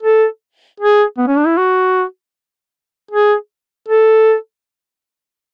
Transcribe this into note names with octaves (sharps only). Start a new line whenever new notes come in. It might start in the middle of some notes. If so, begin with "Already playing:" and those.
A4
G#4
B3
C#4
D4
E4
F#4
G#4
A4